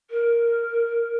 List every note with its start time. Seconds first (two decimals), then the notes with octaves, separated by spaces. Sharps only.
0.10 A#4